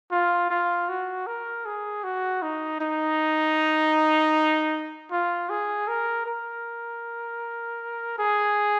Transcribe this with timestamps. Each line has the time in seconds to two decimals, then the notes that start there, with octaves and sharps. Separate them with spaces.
0.11 F4
0.50 F4
0.89 F#4
1.26 A#4
1.65 G#4
2.03 F#4
2.42 D#4
2.80 D#4
5.11 F4
5.49 G#4
5.88 A#4
6.26 A#4
8.19 G#4